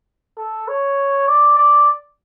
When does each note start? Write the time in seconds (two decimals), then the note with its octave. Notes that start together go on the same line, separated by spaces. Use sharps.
0.38 A4
0.68 C#5
1.28 D5
1.58 D5